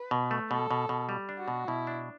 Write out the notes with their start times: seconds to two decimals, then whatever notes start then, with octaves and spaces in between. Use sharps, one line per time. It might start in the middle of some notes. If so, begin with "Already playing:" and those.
Already playing: B4
0.11 B2
0.31 A3
0.50 B2 A4
0.71 B2
0.89 B2
1.09 G3
1.29 D4
1.38 F#4
1.48 B2
1.67 B2 E4
1.87 D4